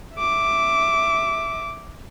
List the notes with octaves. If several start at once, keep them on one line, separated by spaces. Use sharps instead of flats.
E5 D6